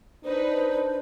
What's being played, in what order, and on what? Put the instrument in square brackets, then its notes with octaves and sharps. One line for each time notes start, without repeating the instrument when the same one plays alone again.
[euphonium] D4 [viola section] D#4 B4 [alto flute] C5